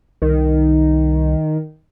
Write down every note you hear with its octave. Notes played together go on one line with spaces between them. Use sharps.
C2 D#3